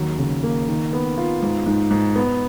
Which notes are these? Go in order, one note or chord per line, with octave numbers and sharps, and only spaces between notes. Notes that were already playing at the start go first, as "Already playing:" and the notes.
Already playing: D#2 F#3
C#3
A#3
D#3
B3
F4
G#2
G#2
G#2
B3